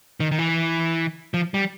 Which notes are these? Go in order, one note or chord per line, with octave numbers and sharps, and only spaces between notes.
D#3
D#3
E3
F3
G3